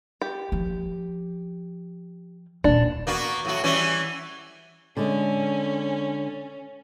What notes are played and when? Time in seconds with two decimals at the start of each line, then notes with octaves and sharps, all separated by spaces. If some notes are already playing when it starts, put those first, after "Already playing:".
0.22 G4
0.52 F3
2.64 D#1 B3 D4
3.07 A#3 B3 F#4
3.45 A2 F#3 F#4
3.64 E3 G3 C#4
4.97 D3 G#3 C#4